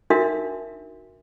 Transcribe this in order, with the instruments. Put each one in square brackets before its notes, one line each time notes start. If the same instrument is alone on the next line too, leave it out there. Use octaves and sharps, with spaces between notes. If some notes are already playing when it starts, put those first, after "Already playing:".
[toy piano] D4 D#4 F#4 A#4 E5